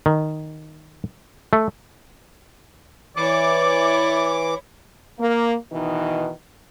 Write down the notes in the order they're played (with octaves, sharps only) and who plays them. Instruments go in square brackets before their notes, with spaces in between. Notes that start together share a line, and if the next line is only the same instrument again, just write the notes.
[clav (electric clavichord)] D#3
A3
[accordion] E3 D6 [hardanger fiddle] E4 C#5 [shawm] D5
[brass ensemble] A#3
B2 D#3 E3 D#4